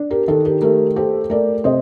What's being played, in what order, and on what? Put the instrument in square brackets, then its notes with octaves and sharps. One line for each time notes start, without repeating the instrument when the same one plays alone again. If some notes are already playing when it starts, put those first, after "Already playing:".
Already playing: [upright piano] D4
[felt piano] G4 A#4
[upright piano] D#3 [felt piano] A4
[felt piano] G4 A#4
[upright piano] A3 [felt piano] G4 A#4
[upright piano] G4 [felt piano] A4 C5
[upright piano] A3 [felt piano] A#4 D5
[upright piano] C3 [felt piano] C5 D#5